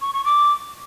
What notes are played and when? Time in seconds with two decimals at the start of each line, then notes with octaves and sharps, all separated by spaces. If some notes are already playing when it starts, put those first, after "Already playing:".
0.02 C#6
0.13 C#6
0.25 D6